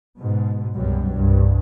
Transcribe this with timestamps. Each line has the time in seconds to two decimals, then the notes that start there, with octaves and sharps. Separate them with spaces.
0.18 G#2 B2
0.75 C2 F#2 B2 F#3 G3
1.14 C2 G2